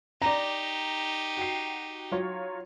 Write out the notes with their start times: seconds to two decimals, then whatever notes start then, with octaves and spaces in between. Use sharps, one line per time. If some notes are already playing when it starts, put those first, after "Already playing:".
0.22 D#4 G4 D5 A#5
1.37 F#4 G5 C7
2.11 F#3 F4 C#5